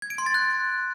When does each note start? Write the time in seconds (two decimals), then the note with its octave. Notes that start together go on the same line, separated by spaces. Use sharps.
0.02 G#6
0.10 D7
0.18 C6
0.26 A6
0.34 F#6